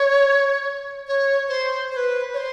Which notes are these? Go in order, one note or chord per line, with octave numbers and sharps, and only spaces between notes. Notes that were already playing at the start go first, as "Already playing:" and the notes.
Already playing: C#5
C#5
C5
C5
B4
C#5
C5